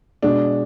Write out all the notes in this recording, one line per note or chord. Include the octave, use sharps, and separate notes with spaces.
B2 G#3 D4